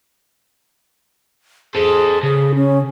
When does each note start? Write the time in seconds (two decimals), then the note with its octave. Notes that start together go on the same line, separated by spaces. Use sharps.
1.75 G#4 A4 C5
2.23 C#3 G#4
2.55 C#4